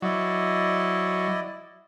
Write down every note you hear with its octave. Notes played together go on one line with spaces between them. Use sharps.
F#3 E4 D5 D#5